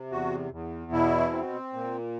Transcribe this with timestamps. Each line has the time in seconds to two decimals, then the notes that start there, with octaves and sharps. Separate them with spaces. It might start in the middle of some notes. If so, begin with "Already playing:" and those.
Already playing: C3
0.11 E2 F#4
0.52 E2
0.92 B2 E4
1.32 C4
1.73 A#2